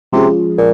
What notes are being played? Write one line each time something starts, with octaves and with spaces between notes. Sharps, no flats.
C3 F3 G#3 C#4 F4 G#4
A#2